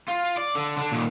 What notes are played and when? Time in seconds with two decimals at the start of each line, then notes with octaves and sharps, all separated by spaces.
0.08 F4
0.37 D5
0.55 D3
0.77 D3 D4
0.92 A#2 D#3